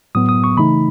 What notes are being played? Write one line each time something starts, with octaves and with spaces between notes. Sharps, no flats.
A2 F#3 B3 D#6
D#6
C#6
C#3 E3 A3 D#4 B5